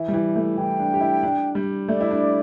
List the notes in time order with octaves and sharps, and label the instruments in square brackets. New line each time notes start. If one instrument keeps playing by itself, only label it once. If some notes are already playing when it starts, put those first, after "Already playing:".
Already playing: [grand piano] E3 [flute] E5
[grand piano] G3
E3
A3
[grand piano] E3 [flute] G5
[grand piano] D4
G4
E4
D4
G3
[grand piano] A3 [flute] D5
[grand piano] E4
D4